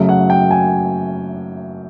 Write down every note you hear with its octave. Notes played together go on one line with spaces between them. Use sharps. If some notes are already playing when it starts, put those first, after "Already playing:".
Already playing: F#2 C#3 F#3 A3
F#5
G5
G#5